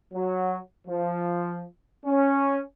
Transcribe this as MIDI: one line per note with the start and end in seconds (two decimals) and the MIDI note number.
0.13 0.58 54
0.87 1.63 53
2.05 2.60 61